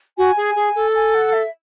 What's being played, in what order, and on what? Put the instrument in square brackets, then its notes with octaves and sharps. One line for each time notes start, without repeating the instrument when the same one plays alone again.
[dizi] F#4 [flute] G#5
[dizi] G#4
G#4
A4
[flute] G#5
F#5
E5